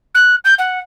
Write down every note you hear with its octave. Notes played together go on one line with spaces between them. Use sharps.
F#6
G6
F#5